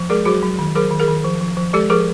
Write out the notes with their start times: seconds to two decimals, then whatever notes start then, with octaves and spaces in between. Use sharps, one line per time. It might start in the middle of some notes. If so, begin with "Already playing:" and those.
Already playing: F3
0.10 G#3 G#4 A#4
0.25 F#3 F#4 G#4
0.43 F#3
0.59 D#3
0.75 F#3 G#4 A#4
0.91 D#3
1.00 G#4 A#4
1.08 D#3
1.24 F3
1.41 F3
1.57 F3
1.73 G#3 G4 A4
1.90 F3 G#4 A#4